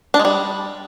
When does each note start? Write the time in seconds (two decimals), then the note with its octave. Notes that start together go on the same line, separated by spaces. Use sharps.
0.14 D4
0.19 G#3
0.25 G3